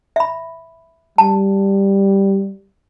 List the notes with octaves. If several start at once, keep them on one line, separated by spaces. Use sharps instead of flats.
E5 B5
G3 A5